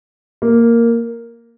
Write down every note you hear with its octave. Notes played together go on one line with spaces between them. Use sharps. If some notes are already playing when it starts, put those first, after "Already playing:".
A#3